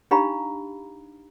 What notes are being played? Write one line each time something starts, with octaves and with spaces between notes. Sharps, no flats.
D4 D#4 G4 F5 A#5 B5